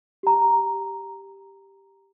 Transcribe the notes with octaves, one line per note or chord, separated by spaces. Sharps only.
G4 A#5